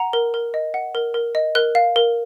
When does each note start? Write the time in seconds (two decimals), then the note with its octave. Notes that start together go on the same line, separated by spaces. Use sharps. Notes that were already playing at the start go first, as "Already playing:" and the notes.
Already playing: F#5 A#5
0.13 A#4
0.34 A#4
0.54 D#5
0.74 F#5
0.95 A#4
1.14 A#4
1.35 D#5
1.55 A#4 F#6
1.75 F5
1.96 A#4